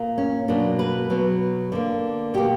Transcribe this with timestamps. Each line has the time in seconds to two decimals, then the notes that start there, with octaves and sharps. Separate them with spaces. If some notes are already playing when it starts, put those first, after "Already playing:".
Already playing: A#2 A#3
0.18 C#4
0.48 B2 F#3 A#3 D4
0.79 B4
1.10 B2 F#3 B3
1.72 D3 A#3
2.34 B2 A#3 G4